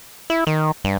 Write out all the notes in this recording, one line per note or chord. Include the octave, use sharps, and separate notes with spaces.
E4
D#3
G2